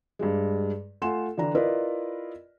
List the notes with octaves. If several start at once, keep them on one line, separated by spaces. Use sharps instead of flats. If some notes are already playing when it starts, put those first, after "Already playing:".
G2 G3 G#3
A3 F4 F#5 G#5 C6 E7
D3 E3 D4 A#5
E4 F4 A#4 B4 D5 D#5